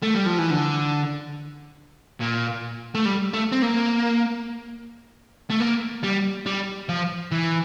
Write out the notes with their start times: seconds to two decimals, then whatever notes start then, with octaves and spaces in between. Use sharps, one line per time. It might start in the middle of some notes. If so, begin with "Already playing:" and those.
0.02 A3
0.14 G3
0.26 F3
0.38 E3
0.50 D3
2.20 A#2
2.95 A3
3.05 G3
3.33 A3
3.52 C4
3.62 A#3
5.50 A3
5.61 A#3
6.04 G3
6.46 G3
6.89 F3
7.32 E3